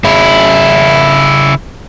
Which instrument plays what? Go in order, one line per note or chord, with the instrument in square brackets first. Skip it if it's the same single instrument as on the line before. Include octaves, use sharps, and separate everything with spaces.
[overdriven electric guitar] C#3 E4